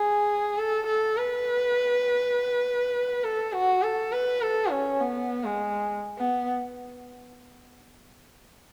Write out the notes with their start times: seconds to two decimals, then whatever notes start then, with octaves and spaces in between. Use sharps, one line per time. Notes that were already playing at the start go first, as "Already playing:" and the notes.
Already playing: G#4
0.58 A4
0.87 A4
1.17 B4
3.24 A4
3.53 F#4
3.83 A4
4.12 B4
4.41 A4
4.71 C#4
5.00 B3
5.45 G#3
6.18 B3